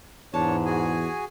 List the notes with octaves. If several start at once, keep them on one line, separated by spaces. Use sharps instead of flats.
E2 G#2 D4 C#5 A5
F#4 G#4 G#5